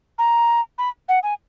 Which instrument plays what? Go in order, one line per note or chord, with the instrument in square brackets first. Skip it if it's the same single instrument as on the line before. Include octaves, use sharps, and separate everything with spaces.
[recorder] A#5
B5
F#5
G#5